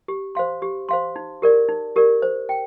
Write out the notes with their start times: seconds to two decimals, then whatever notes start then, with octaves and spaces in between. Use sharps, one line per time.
0.08 G4
0.35 C5 F5 C6
0.62 G4
0.89 C5 F5 C6
1.16 D#4
1.42 G4 A#4 D5
1.69 D#4
1.96 G4 A#4 D5
2.22 C5
2.49 G5